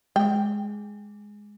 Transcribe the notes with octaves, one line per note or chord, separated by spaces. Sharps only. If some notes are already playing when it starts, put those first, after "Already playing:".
G#3 G5